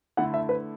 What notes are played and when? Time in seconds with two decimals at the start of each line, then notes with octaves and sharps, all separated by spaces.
0.17 D3 A3 E4 F#5
0.34 E5
0.49 B4